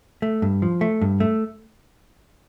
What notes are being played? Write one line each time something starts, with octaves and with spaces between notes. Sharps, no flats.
A3
G2
F3
A3
G2
A3